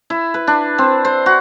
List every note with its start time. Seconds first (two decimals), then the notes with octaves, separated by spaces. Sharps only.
0.10 E4
0.34 B4
0.47 D4
0.78 C4
1.05 C5
1.26 F#4